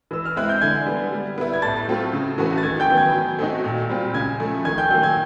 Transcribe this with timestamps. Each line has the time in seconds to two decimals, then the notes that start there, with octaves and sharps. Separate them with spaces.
0.11 E3 E6
0.25 F6
0.37 G#3 C4 E4 F#6
0.49 G6
0.61 D3 G#5 G#6
0.86 G3 B3
1.12 G3
1.38 B3 E4
1.53 G#6
1.62 A2 A5 A6
1.88 F#3 A3 C4 F4
2.13 C#3
2.38 E3 A3 C#4 F#4
2.58 A6
2.63 D#3 G#5 G#6
2.80 G5 G6
2.89 F#3 B3
2.97 G#5 G#6
3.14 F#3
3.38 A3 C4 D#4 F#4
3.64 A#2
3.89 G3 C4 F4
4.14 C#3 G#5 G#6
4.40 F3 A3
4.65 D#3 G#5 G#6
4.78 G5 G6
4.90 F#3 A#3 G5 G6
5.03 G#5 G#6